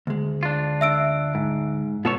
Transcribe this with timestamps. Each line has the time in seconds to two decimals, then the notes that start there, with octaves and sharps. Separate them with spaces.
0.07 D2 G#3
0.43 D4 F4
0.81 E5 E6 D7
1.35 G#2
2.05 B2 B3 F4 A4 C#5